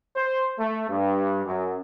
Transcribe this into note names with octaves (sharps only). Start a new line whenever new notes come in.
C5
A3
G2
F#2